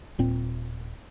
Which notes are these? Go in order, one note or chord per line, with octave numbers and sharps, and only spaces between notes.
D#1 A#2 C4